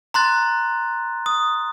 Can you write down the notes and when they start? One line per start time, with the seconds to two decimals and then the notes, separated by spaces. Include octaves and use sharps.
0.14 A#5 C6 F#6 A6
1.26 D#6